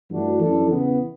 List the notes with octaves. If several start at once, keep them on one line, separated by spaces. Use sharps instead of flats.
G2 E3 A3 D4 F#4
F#2 E3 G3 D4 A4
E2 C#3 E3 B3